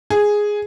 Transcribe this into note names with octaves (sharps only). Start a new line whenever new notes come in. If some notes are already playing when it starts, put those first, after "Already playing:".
G#4